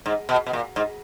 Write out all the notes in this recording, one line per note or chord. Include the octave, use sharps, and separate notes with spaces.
G#2
B2
B2
A#2
G#2